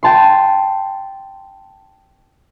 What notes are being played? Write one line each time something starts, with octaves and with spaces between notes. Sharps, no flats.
G5 A5 C6